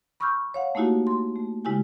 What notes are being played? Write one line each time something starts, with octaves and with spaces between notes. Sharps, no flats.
B5 C#6 D6 E6 F6 G6
C#5 F5 F#5
A3 A#3 D#4 E4 F#4 G4
C6
A3
C#3 G#3 E4 G4 G#5